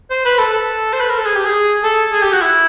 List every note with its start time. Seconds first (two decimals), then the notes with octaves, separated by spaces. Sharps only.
0.11 C5
0.25 B4
0.39 A4
0.53 A4
0.93 C5
1.00 B4
1.10 A#4
1.18 A4
1.26 G#4
1.36 G4
1.45 G#4
1.84 A4
2.13 G#4
2.22 G4
2.32 F#4
2.42 E4